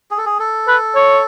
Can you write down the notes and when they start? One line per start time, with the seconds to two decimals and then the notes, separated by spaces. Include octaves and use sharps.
0.11 G#4
0.18 A4
0.26 G#4
0.39 A4
0.68 B4
0.95 C#5